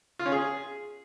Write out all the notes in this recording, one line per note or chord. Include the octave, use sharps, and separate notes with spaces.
F4
C#4
G#4